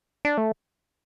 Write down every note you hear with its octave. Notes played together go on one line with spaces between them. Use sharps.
D4
A3